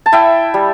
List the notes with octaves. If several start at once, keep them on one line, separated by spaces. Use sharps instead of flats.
A5
E4 E5 G5
G3